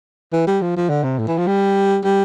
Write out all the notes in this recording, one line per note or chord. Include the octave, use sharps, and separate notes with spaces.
E3
G3
F3
F3
D3
C3
A2
E3
F3
G3
G3